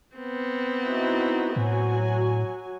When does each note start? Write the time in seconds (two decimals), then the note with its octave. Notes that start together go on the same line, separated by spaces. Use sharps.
0.16 B3 C4
0.83 D#4 E4 F#4
1.56 A2 F#3 F#4 G#5